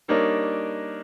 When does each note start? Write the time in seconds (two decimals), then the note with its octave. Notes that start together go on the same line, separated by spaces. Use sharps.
0.08 G3 A#3 D4 D#4 A#4 C#5